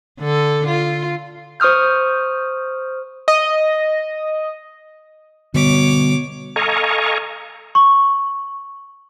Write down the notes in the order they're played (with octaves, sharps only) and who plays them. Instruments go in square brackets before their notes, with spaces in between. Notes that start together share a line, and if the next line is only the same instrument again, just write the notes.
[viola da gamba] D3 A4
F4
[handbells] C5 C#6 D#6 F6 G6
[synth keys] D#5
[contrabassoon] B2 [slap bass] D3 G3 [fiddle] C#5 D6
[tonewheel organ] A4 D#5 F5 G#5 A#5 C#6
[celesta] C#6